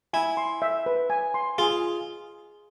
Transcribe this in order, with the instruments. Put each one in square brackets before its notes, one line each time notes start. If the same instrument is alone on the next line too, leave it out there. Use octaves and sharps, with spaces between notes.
[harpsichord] E4 [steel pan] G#5
[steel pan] C6
E5
B4
G#5
C6
[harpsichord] F4 [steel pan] G#4